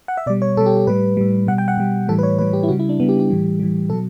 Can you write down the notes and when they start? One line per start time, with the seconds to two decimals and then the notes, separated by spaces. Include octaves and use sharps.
0.08 F#5
0.17 E5
0.26 B2 D5
0.30 G3
0.42 C#5
0.57 B2 G3 A4
0.66 G4
0.77 G4
0.87 A2 G3 B4
1.17 A2 G3
1.47 B2 G3 F#5
1.58 G5
1.68 F#5
1.77 B2 G3
2.08 A2 E3 G3 A4
2.19 B4
2.23 C#5
2.39 A2 E3 G3 B4
2.53 G4
2.63 E4
2.69 C#3 G3 F#4
2.79 E4
2.89 D4
3.00 C#3 G3 B3
3.09 G4
3.20 G4
3.30 A2 E3 G3
3.59 A2 E3 G3
3.90 B2 F#3 A4